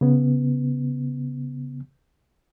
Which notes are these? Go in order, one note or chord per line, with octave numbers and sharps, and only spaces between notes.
C#3 B3